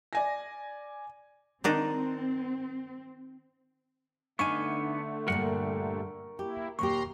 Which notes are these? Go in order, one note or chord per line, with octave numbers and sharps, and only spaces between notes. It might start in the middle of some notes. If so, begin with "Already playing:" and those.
D5 G#5 A#6
D#3 C4 D4 D#4
D3 A3 B3 D4 D#4 F5 G#5 C#6
G2 A#2 G3 A#4 F#5
A#3 E4 G4
D#2 A#2 G4 A#5 C6 C#6